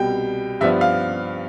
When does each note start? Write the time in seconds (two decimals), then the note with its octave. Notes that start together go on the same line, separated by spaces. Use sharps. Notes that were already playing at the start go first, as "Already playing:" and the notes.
Already playing: C2 B2 G3 G5
0.61 G2 F3 B3 D4 E5
0.81 F5